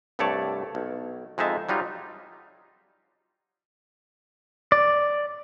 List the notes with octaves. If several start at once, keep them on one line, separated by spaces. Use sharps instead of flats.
C2 G2 A3 C#5 D5 A5
B1
F2 G#3 D#4 E5 A5
F#3 G3 D#4 F4
D5